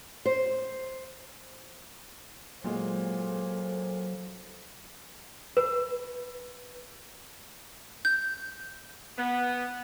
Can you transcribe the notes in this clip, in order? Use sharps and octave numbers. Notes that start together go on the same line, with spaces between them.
C5
A#2 F#3 G#3 A#3 A4 C5
B4
G6
B3